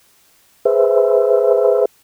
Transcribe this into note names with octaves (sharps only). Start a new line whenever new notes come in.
G#4 B4 C5 E5